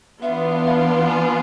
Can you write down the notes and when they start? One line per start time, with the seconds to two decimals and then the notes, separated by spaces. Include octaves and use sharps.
0.22 E3 B3 D4 F4 E5
0.66 F5
1.09 G#5